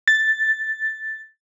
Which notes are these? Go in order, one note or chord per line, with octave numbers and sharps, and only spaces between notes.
A6